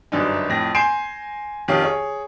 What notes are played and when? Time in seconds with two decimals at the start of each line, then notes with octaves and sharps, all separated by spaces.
0.12 G1 F#2 D4 D#4
0.49 F2 A2 A#6
0.75 G#5 C6 G6 C7 D7 E7
1.68 F2 D#3 C#4 G4 F5
1.84 G#4 C#5